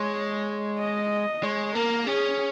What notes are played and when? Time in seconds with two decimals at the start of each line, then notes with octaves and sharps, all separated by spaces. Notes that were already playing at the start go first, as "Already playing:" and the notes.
Already playing: G#3 C#5
0.79 D#5
1.43 G#3 C#5
1.75 A#3 A#4
2.07 C#4 G#4